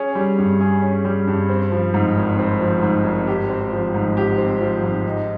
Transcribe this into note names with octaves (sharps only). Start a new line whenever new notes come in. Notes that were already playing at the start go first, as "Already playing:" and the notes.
Already playing: C#4 G#4
G3
G2
G#4
C#4
G3
G2
C4
F3
G#2
G#1
C4
F3
G#2
G#1
G4
C4
F3
G#2
G4
C4
F3
G#2
D#4